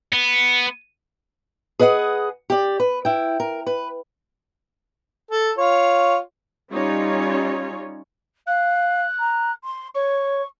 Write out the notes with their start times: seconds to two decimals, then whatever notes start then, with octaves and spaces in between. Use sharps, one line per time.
0.13 B3
1.79 G#4 B4 D#5 F5 F#5
2.50 G4 D5
2.80 B4
3.05 E4 G5
3.40 A#4
3.67 B4
5.31 A4
5.58 F4 C#5
6.71 G3 C#4 D#4 F4 C#5
8.47 F5 F#6
9.19 A#5
9.63 C6
9.94 C#5 C#6